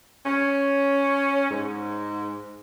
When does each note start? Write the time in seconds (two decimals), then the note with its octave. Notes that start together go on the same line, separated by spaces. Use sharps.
0.25 C#4
1.50 G#2